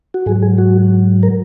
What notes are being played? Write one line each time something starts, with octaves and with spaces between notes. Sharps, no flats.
F#4
G#2 F#3 G#4
G#4
F#4
A#4